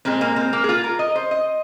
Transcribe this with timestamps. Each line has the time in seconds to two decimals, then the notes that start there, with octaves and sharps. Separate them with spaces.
0.05 A#2 G#3 C4
0.21 A#3
0.36 C4
0.53 A#3
0.64 G#4
0.69 F4
0.84 A#4
0.99 D#5
1.16 C5
1.31 D#5